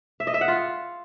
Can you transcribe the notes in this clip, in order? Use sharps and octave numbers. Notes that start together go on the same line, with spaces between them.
E5
D#5
E5
F#5
F4